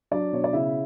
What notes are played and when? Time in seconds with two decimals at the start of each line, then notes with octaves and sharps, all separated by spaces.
0.11 F#3 D4 D5
0.33 B2 C#5
0.44 D5
0.53 C#3 E4 E5